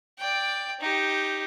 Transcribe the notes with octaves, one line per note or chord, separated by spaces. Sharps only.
D5 G5
D#4 G4